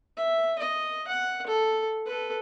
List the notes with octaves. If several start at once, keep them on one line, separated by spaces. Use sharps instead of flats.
E5
D#5
F#5
A4
A4 B4